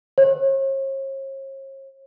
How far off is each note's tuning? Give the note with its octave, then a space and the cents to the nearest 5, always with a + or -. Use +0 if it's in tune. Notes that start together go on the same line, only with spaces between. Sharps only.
C#5 -45